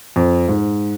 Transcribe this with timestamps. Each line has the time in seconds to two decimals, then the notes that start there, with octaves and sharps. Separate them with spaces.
0.16 F2
0.48 G#2